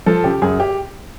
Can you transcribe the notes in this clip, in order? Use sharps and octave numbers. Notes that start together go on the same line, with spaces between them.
F3 A4
C#3 G4
F#2 G#4
G4